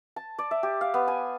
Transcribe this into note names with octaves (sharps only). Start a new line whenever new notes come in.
A5
D5
E5
G4
F5
B3
G#5